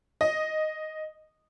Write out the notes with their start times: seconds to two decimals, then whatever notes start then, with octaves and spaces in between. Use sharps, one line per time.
0.21 D#5